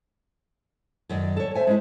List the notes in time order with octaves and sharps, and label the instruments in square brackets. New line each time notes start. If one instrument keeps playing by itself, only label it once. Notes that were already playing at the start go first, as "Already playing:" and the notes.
[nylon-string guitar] F#2 D#3 D5
A4 C#5
[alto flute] C5 [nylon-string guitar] E5 G#5
[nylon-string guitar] G#3 C#4 E4